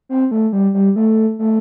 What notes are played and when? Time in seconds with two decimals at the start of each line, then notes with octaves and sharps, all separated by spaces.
0.09 C4
0.31 A3
0.53 G3
0.74 G3
0.96 A3
1.39 A3